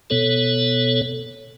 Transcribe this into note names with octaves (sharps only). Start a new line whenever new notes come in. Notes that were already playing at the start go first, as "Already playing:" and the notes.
B2 B3 A4 C#5